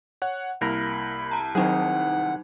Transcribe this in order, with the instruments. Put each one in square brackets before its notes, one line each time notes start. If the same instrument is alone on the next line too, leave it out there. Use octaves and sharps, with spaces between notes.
[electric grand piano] C#5 F#5
[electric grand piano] C2 E4 A#6 [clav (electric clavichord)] A#3 A#4 [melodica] B5
[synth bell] A5 A#5
[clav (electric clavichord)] D#3 C4 G#4 [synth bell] F#3 D#4 [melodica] F#5